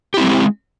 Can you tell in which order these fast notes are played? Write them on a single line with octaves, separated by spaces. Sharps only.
G4 E4 C4 G3 G#3